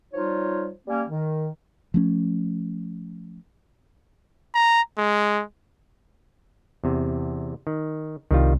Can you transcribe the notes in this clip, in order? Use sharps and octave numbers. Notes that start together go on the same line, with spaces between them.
F3 G3 D#4 F4 C#5
G3 A#3 C#4
D#3
F3 A3 C#4
A#5
G#3
E2 C3
D#3
C2 D#3 G3 F4